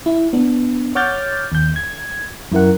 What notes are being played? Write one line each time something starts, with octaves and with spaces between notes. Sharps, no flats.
E4
B3 D4
C#5 F#5 D6 F6 G6 A6
D#2 G6
G#6
F#2 E4 A#4 F#5